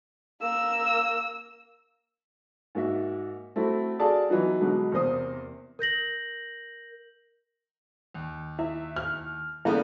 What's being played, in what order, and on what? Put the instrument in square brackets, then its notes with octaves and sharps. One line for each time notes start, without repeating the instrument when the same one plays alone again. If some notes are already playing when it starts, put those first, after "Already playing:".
[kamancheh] A#3 E6
[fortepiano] G#2 A#3 F#4 E5
A3 C4 E4 F#4
F#4 G#4 A4 D5 F5 A5
E3 F#3 B3 D#4
B2 D3 F#3 G#3
E2 C3 A#3 A#4 C5 D#6
[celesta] A#4 G6 A#6 F#7
[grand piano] D#2
[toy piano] E4 [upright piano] E5
[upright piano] F6
[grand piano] C#3 G3 B3 [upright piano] A#3 [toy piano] E4 A4